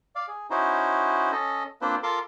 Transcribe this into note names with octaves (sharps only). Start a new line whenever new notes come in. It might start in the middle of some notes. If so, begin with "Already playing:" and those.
D5 F5
G#4
C#4 D#4 E4 F#4 C5
C#4 A4 D#5
A#3 C4 D4 F4 B4 C5
F4 A4 A#4 C6 D6